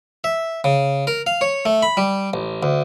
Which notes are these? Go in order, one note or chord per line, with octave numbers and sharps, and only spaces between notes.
E5
C#3
A#4
F5
C#5
A3
B5
G3
A1
D2